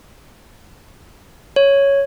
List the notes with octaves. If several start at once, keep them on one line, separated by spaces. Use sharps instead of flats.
C#5